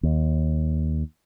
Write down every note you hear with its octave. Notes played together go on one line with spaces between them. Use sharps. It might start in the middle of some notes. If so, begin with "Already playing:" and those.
D#2